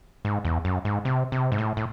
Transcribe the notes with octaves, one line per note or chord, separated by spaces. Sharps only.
G#2
E2
F#2
G#2
C3
C3
G#2
A2
A2